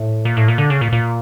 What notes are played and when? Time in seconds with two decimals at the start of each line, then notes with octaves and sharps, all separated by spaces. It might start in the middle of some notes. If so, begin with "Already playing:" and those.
Already playing: A2
0.25 A#2
0.37 A2
0.48 A#2
0.58 D3
0.70 C#3
0.81 A#2
0.92 A#2